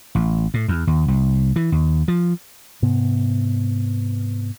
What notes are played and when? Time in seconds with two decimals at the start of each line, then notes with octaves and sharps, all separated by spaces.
0.15 A1
0.54 A2
0.68 E2
0.87 D#2
1.08 C2
1.56 E3
1.72 D#2
2.08 F3
2.82 G#2 C3 B3